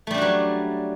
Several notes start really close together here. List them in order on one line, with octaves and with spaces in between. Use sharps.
A3 G3 D4 F#4 F#3